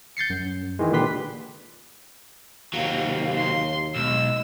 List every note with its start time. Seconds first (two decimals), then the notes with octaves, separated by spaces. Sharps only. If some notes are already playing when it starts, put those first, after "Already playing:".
0.17 G6 A6 C7 C#7
0.30 F#2
0.79 D#3 E3 G#3
0.92 A#2 D3 G4 B4 C6 B6
2.73 D#2 C3 F#3 F5
3.38 C6
3.96 B1 G#3 E6